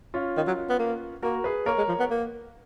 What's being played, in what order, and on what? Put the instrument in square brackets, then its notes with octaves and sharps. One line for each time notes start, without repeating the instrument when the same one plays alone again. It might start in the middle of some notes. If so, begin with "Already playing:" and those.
[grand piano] C#4 F4
[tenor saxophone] D#3
F#3
B3
A#3
[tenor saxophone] A#3 [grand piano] F#4 A#4
[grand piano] G#4 B4
[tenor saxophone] A#3 [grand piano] A#4 C#5
[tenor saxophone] G#3
F3
B3
A#3